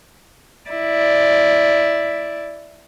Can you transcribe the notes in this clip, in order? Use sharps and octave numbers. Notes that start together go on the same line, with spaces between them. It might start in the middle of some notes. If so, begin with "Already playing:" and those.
E4 D5